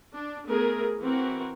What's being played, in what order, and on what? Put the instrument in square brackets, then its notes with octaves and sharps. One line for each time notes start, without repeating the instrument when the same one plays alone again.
[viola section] D4
A3 B3 G#4 A#4
E3 C4 F#4 A#4